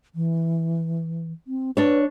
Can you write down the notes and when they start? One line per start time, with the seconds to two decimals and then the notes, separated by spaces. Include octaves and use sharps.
0.15 E3
1.47 C4
1.77 D4 B4 C#5